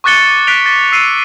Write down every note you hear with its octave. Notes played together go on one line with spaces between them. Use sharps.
C#6 D6 F#6 A6 C#7 G7
F#6 B6 D7 F7 G7
A6 G7
E6 C7 D#7